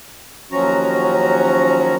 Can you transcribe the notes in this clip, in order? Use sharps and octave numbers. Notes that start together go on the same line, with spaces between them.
D#2 F3 F#3 C#4 F#4 A#5